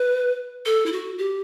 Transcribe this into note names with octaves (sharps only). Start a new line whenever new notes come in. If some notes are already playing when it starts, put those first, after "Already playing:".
Already playing: B4
A4
E4
F#4
G4